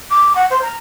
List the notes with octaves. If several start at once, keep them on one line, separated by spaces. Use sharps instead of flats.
D6
F#5
C5
A#5